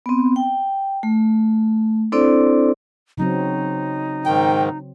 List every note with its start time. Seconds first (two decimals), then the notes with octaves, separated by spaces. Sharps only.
0.06 B3 C4
0.36 G5
1.03 A3
2.12 C4 D4 E4 A4 C5 D5
3.18 C#3 F#3 C4 D#4
4.25 G#2 D#3 G5